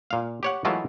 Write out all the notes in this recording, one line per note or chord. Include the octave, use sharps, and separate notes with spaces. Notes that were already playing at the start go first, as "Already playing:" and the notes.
A#2 F5
G4 C#5 F#5
E3 F#3 G#3 A3 E4 F4